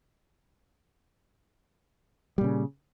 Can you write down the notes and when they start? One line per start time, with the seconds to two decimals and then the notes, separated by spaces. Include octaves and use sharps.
2.38 G3
2.41 A#2
2.44 C#3